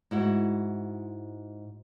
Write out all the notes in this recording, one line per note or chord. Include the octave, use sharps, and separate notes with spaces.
G#2 E4 F#4